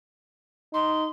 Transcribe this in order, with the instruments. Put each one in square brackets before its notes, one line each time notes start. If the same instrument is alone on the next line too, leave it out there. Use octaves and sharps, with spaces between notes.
[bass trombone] D#4 [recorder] C6